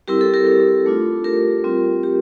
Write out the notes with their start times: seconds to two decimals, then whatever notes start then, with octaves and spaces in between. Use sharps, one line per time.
0.08 G3 C4 E4 G4 A#4
0.21 A4
0.34 G4 A#4
0.47 A4
0.86 A3 D4 F4
1.24 G4 A#4
1.64 G3 C4 F4
2.03 G4